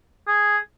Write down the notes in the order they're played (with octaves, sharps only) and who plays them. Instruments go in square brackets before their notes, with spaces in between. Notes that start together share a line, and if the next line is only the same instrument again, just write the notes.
[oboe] G#4